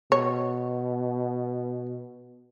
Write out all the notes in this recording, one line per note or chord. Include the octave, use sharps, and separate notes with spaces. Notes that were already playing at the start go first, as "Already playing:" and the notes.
B2 C#5